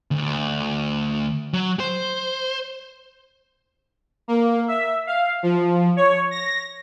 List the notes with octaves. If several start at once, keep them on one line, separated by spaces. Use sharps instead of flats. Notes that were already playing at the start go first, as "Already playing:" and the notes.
D2
F#3
C5
A#3
E5
F5
F3
C#5
A#6